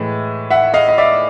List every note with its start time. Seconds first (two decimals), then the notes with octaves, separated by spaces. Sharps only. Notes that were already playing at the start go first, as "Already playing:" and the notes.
Already playing: A2 E3 G#3
0.50 E5 F#5
0.74 D#5 F5
0.89 D#5
0.98 D5 E5